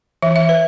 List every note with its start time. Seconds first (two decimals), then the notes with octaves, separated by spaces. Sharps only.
0.22 E3 E5
0.36 E5
0.42 E3
0.49 B4